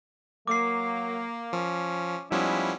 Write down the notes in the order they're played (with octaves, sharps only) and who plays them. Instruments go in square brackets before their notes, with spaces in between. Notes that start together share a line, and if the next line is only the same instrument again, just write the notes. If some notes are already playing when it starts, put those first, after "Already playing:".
[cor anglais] F#3 [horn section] A#3 [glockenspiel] D6 C7
[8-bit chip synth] F3 [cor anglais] C#4
[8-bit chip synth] F3 G3 C#4 [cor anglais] G#3 [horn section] B3 D#4 E4